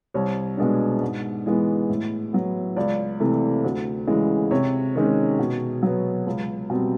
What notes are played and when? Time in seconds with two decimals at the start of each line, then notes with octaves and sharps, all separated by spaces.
0.14 C2 C#5
0.57 B2 G#3 B3 D4
1.02 G#2
1.46 E3 G#3 B3
1.90 A2
2.33 F#3 B3
2.76 C#2 D5
3.20 C3 E3 A3
3.64 D2
4.07 C#3 E3 G#3
4.51 C3 C#5
4.96 D#3 G#3 C#4
5.39 B2
5.82 F#3 B3
6.26 C#2
6.70 B2 G3 C4